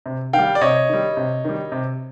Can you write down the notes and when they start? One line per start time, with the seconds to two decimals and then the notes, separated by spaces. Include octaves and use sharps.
0.06 C3
0.33 D#3 F5 G5
0.39 G3
0.55 D5
0.61 C3 C#5 D#5
0.89 D#3 G3
1.17 C3
1.44 D#3 G3
1.72 C3